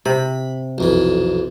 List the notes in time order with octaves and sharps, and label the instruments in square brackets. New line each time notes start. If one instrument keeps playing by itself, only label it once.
[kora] C3 [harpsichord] B5
[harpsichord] B1 F2 E3